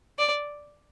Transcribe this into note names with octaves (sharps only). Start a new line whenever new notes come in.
D5